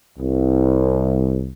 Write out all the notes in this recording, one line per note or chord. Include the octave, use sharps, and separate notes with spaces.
C2